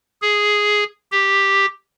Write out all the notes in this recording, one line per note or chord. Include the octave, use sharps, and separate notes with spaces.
G#4
G4